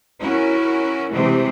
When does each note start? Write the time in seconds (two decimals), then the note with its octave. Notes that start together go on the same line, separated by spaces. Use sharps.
0.21 C#4 E4 F#4 A#4
1.11 C3 E3 G#3 A3 C4